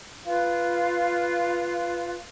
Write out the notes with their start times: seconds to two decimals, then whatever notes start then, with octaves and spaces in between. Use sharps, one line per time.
0.25 F4 B4 F5